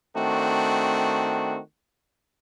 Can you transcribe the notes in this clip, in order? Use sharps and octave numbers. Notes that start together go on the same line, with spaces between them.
D#3 A3 C4 D4 F#4